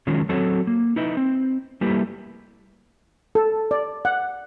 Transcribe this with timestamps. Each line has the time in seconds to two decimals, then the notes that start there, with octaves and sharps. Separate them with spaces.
0.07 D#3 F#3 G#3 C#4 F4
0.29 F#3 C4 F#4 A4 C#5
0.67 A#3
0.96 D#4 E4 B4 D#5
1.17 C4
1.81 G3 A3 A#3 E4 G4 B4
3.35 A4
3.71 D5
4.05 F#5